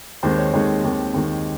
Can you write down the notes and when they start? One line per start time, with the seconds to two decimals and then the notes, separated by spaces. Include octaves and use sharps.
0.23 D#2 D#3 G#3 C4 C5
0.38 C#5
0.53 D#2 D#3 G#3 C4 C#5
0.84 D#2 D#3 G#3 C4
1.14 D#2 D#3 G#3 C4